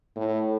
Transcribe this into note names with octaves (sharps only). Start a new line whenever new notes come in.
A2